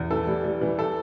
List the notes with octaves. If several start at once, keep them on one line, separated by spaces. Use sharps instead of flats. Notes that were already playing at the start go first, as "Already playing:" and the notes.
Already playing: E2
E3 A4
G3
G3
E3
A4